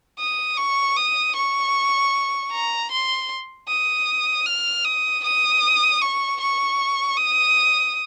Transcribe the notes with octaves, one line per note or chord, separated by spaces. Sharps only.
D#6
C#6
D#6
C#6
A#5
C6
D#6
F6
D#6
D#6
C#6
C#6
D#6